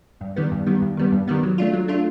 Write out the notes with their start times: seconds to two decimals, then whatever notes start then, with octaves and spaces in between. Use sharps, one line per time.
0.21 G2
0.36 D#3 G3 B3
0.52 G2
0.67 D#3 G3 B3
0.82 G2
0.97 D#3 G3 B3
1.12 G2
1.27 D#3 G3 B3
1.43 F#3
1.58 A3 D4 F4
1.73 F#3
1.88 A3 D4 F4